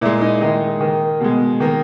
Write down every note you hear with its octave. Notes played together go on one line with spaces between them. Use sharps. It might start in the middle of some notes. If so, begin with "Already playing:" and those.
A#2 G#3 E4
D#4
D#3 G#3 D#4
D#3 A#3
B2 G#3
D#3 A#3